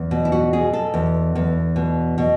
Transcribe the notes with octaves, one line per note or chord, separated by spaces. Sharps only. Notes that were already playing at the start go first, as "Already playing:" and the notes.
Already playing: E2
B2
E4
F#4
B2 G#4
A4
E2
E2
B2
B2